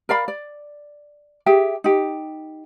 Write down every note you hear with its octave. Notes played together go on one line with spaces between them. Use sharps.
A#4 D5 F5 B5
D5
G4 G#4 E5 G5
D#4 G4